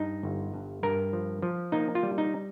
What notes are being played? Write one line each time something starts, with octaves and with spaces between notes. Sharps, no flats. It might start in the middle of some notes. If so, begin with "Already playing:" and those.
Already playing: G2 D#4
G1
G2
G2 A#4
F3
F3
A#3 D#4
F4
G3
D#4